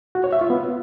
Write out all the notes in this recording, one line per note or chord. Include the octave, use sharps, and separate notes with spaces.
F#4
C#5
E5
F4
B3